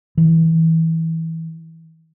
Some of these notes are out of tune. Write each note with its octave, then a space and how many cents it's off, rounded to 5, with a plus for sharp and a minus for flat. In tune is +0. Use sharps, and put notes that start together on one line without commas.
E3 -20